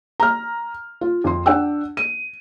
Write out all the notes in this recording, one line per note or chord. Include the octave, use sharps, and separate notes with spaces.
A#5 F6
F4
F2 C6
D4 F#5 G5 E6
D#7